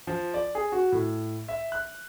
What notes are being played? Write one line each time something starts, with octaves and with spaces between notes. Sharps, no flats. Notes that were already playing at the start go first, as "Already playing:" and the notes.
F3
D5
G#4
F#4
A2
E5
F#6